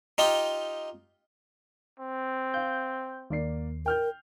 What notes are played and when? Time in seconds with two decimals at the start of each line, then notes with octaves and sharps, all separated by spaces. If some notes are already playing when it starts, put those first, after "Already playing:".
0.18 D#4 F4 G4
1.99 C4
2.54 F5 G6
3.30 D#2 A#3 D5 C7
3.86 A#4 G5 F6 G6